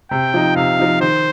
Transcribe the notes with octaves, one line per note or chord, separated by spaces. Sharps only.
C3 G5
F3 D#4
C3 F5
F3 D#4
D#3 C5